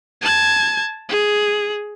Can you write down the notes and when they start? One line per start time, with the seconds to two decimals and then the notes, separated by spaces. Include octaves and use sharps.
0.22 A5 G#6
1.09 G#4